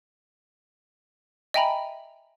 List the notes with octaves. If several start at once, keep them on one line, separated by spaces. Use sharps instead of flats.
D#5 E5 G5 G#5 A#5 B5